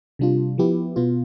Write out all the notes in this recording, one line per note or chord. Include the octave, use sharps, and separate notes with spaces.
C3 G3 D4 F4
F3 B3 E4 G4
B2 B3 F4